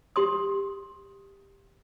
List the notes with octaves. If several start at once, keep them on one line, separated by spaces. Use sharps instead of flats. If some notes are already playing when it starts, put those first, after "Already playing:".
G4 C6 D#6